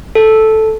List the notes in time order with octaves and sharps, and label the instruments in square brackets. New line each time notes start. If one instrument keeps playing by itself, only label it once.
[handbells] A4